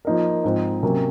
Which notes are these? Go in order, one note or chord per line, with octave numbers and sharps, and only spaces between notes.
F3 A#3 D#4 A#4
G#2 F3 C4 D#4
C3 F#3 A#3 C#4